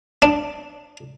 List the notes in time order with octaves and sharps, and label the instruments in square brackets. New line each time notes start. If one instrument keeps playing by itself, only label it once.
[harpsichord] D4